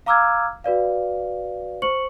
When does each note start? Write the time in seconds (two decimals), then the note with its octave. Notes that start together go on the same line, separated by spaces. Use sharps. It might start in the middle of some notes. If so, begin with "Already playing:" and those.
0.06 F5 A#5 D6 E6 F6 G#6
0.64 F#4 B4 D5 F5
1.82 C5 C#6 C#7 F#7